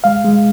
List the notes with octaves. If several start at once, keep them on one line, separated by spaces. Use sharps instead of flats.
G#3 F5
G#3